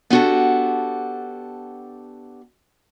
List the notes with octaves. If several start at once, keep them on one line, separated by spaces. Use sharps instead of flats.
B3 D4 F#4 G4 A4